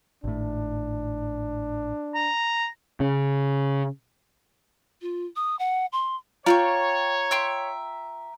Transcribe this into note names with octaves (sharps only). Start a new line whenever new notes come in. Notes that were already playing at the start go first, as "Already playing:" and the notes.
G#1 A2 D4
A#5
C#3
F4
D#6
F#5
C6
F4 C#5 D5 G5 A#5 C#6
E5 G5 C6